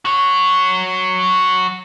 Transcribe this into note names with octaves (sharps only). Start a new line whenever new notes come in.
F#4 C#5